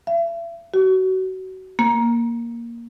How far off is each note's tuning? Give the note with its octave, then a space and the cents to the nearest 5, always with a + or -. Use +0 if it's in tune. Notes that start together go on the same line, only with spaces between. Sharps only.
E5 +40
F#4 +25
A#3 +5